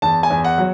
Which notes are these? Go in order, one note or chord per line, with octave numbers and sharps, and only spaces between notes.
E2 A5
G#5
E2
F#5
F#3